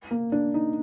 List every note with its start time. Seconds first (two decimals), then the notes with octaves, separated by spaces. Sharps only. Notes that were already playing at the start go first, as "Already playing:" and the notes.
0.11 A#3
0.32 D4
0.54 D#4